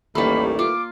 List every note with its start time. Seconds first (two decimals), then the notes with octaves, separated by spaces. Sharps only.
0.15 A1 D#2 D#3 E3 G3 A3 A#3 B5
0.59 F4 D6